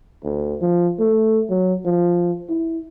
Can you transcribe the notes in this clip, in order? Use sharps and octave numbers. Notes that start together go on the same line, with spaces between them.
D2
F3
A3
F#3
F3
E4